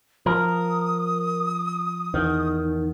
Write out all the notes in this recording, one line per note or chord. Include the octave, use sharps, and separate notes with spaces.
F3 A#4 D#6
E2 D#3